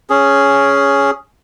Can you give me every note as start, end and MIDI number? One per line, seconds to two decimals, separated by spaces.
0.10 1.11 61
0.10 1.11 68